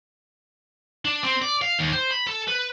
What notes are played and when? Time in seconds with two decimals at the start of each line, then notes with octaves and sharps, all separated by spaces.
1.05 D4
1.24 C4
1.42 D5
1.62 F5
1.79 D#2
1.93 C5
2.11 B5
2.27 A4
2.48 B4